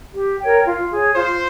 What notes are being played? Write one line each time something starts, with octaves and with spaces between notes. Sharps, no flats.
G4
A#4 C#5 G5
F4
G#4 C#5
F4 C5